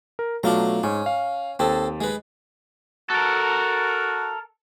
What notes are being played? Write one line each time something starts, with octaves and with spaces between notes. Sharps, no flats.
A#4
B2 F#3 A3 D4 F4 A#5
G#2 C#4
F5
D#2 C4 A4
G#3 B4
F#4 A4 A#4